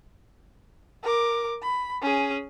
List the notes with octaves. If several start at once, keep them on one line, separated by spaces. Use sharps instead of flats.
A#4 D6
B5
C#4 G#4